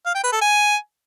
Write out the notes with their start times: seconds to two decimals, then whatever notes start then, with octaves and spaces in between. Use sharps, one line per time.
0.06 F5
0.15 G5
0.24 B4
0.33 A4
0.41 G#5